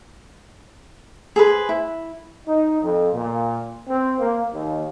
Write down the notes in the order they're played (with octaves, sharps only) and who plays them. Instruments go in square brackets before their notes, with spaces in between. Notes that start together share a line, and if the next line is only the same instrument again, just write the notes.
[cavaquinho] G#4 A4 B4 C5
E4
[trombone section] D#4
F2
A#2
C4
A#3
D#2